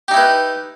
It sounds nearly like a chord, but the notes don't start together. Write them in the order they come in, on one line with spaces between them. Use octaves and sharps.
G4 D#4 E4 B4